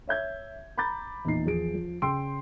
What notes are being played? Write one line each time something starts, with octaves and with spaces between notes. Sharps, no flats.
C#5 E5 G6 G#6
A#5 B5 D6 G6 A6
E2 A#2 D#4 C7
E2 F3 G#4 D7
F3
C#3 G#4 G5 C6 E6 D7